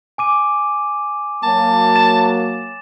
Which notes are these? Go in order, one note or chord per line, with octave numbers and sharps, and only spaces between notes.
G#5 D6 D#7
F#3 A#3 A5
A6 E7